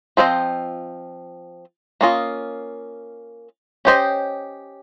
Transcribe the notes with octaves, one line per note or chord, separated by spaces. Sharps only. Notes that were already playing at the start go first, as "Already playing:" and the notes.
F3 C4 F4 C5 D#5
A#3 C#4 F4 C5 D#5
C#4 G4 C5 D#5